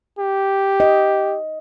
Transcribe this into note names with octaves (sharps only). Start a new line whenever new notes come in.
G4
D#5